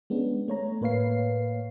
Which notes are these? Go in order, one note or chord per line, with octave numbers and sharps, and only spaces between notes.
G#3 B3 C#4 D4
A3 C#5 A#5
A2 A#3 B4 C#5 F5 C7